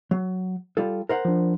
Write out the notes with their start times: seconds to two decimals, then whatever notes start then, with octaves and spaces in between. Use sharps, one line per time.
0.11 F#3
0.77 G3 F4 A4
1.09 A#4 C5 F#5
1.25 F3 D4